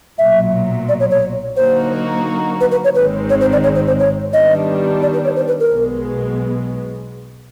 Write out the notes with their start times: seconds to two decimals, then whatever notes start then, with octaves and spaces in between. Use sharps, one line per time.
0.18 B1 A#2 F#3 E5
0.88 D5
1.00 C#5
1.11 C#5
1.56 D3 F#3 A#3 D#4 F#4 C5
2.61 B4
2.71 B4
2.84 C#5
2.95 G#1 G#2 D#3 G#3 C4 B4
3.29 C#5
3.41 C5
3.52 D5
3.63 C#5
3.75 C5
3.87 C5
3.99 C#5
4.33 D#3 G3 B3 D4 D#5
5.02 D5
5.13 B4
5.24 C#5
5.36 C5
5.48 B4
5.60 A#4
5.71 B1 B2 G#3 B3